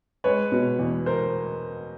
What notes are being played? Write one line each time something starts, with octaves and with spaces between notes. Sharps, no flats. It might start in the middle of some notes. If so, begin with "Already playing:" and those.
G#3 B4 C#5
B2
E2
A#4 C5